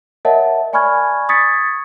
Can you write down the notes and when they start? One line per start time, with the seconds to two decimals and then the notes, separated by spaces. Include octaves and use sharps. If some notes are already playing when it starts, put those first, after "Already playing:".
0.25 A#4 C#5 D#5 E5 F#5 A5
0.73 D5 G#5 B5 C#6 F6 G#6
1.29 C#6 D#6 G#6 A6 B6 C#7